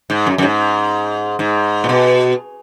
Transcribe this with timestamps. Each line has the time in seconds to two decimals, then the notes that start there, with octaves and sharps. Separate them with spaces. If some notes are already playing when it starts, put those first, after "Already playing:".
0.10 G#2
0.27 F#2
0.38 F#2
0.42 G#2
1.39 G#2
1.84 A#2
1.89 B2